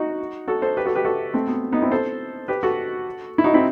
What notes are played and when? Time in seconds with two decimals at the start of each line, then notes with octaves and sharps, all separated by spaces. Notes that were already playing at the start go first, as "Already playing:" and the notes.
Already playing: D#4 F#4
0.48 F#4 A4
0.62 A4 C5
0.77 G4 B4
0.86 F#4 A4
0.95 G4 B4
1.05 F#4 A4
1.34 A3 C4
1.48 B3
1.72 B3 D#4
1.82 C4 E4
1.92 A4 C5
2.48 G4 B4
2.63 F#4 A4
3.38 E4
3.44 D#4 F#4
3.54 C4 E4